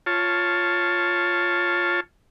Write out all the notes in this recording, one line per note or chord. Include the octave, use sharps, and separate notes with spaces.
F4 C#5 A5